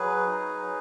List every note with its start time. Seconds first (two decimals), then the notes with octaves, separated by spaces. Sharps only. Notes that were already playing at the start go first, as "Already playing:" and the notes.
Already playing: F#3 G#4 B4
0.26 D#4